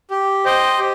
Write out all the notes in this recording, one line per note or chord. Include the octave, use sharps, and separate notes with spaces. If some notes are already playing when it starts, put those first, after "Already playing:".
G4
C5 D#5 G5
G4